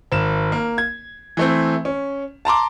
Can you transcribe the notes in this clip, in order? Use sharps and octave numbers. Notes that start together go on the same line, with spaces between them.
G#1 E7
A#3
G#6
E3 A3 C4
C#4
A5 A#5 C6 D6